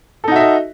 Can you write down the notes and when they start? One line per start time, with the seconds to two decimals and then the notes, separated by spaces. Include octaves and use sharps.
0.24 A4
0.28 D#4
0.32 F#4
0.36 E5
0.40 D#5